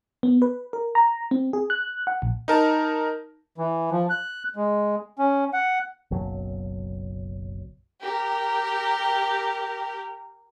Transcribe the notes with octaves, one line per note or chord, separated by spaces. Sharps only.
B3
B4
A#4
A#5
C4
G#4
F#6
F#5
A#1
D#4 A#4 A5
E3
F3
F#6
G#3
C#4
F#5
F#1 B1 F#3
G4 A#4